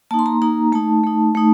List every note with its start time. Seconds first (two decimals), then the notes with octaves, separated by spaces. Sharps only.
0.11 A#3 D#4 A5
0.19 C6
0.26 A#5
0.42 A#3 D#4 A#5
0.72 A3 D#4 A5
1.03 A3 D#4
1.35 A3 D#4